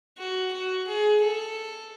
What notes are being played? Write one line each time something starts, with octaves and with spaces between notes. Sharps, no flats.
F#4
F#4
G#4
A4